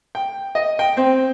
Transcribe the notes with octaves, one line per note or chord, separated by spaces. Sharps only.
G5
D#5
G5
C4